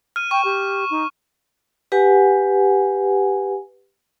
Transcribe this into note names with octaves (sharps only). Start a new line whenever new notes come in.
F6 D#7
G5 C#6
G4
D#4
G4 B4 F#5 G#5